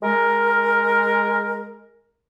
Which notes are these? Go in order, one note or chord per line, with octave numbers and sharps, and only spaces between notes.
G#3 A#4